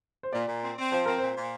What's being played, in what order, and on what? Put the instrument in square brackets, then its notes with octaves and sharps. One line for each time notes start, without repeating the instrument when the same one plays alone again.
[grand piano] C5
[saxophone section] A#2 [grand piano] D5
[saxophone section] A#2
C4
C4
[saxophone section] F3 [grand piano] C5
[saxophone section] C4 [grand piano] A#4
[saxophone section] A#2 [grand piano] C5
[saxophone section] A#2